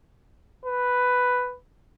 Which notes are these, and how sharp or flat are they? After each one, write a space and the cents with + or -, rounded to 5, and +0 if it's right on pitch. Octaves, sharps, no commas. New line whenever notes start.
B4 +5